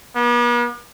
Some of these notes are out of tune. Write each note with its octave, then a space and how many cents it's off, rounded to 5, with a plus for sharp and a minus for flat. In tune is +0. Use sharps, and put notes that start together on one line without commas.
B3 -45